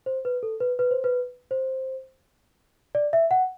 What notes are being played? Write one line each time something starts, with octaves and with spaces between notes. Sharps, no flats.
C5
B4
A4
B4
B4
C5
B4
C5
D5
E5
F#5